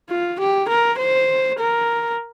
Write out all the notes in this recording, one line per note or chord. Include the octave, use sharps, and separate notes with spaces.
F4
G4
A#4
C5
A#4